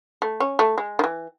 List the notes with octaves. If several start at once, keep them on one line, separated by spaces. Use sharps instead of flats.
A3
C#4
A3
G#3
D#3
E3